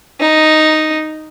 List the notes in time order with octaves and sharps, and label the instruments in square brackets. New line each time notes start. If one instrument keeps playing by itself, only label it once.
[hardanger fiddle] D#4